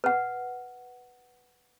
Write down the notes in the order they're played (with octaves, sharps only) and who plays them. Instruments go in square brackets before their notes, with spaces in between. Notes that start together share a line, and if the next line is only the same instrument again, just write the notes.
[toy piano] B4 F#5